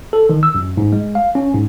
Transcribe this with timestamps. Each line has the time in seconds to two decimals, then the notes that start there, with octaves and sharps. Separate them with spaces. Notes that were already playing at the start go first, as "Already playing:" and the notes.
0.13 A4
0.29 D#3
0.43 E6
0.55 F#2
0.77 G#2
0.92 G#3
1.15 F5
1.35 C#4
1.54 G#2